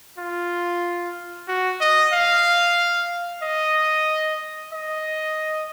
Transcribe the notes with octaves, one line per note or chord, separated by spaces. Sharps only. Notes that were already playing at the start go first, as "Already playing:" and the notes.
F4
F#4
D#5
F5
D#5
D#5